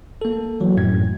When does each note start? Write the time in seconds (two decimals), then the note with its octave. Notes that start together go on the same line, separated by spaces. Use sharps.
0.21 A#3 A4
0.61 E3 F#3
0.77 F#2 A2 G#6